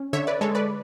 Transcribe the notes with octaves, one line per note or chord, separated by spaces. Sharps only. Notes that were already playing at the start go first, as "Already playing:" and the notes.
Already playing: C#4
D3 C#5 E5
B4 D5
G#3 A4 C#5
B4 D5